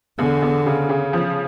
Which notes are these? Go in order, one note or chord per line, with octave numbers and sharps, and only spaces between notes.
E2 D3
E2
C#3
C#3
F3